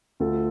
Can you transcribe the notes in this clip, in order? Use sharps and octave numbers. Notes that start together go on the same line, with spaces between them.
D2 F4 A4